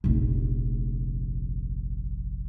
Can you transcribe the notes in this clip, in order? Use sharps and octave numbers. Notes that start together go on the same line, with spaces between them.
F1 A#1